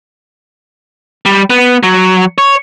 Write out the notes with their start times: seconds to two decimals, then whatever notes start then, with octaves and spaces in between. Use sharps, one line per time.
1.26 G3
1.50 B3
1.83 F#3
2.38 C#5